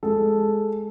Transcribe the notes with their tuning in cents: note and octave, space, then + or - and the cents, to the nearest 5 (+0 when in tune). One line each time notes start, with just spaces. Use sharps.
G#3 +0 A4 +0